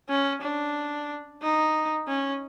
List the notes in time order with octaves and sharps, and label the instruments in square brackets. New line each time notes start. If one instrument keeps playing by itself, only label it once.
[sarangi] C#4
D4
D#4
C#4